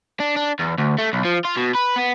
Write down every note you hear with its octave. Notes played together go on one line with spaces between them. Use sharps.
D4
D4
E2
D2
A3
B1
F3
F4
B2
B4
B3